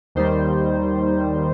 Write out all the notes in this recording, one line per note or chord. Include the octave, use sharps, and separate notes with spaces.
D#2 D#3 G3 C5